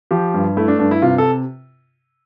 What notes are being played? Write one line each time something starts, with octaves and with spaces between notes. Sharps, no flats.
F3 G4
G2
A3 E4
D4
G2 D4
E4
C3 F4
A4